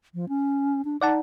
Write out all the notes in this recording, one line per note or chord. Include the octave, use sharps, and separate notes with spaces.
F3
C#4
D4
D#4 D5 F#5 A5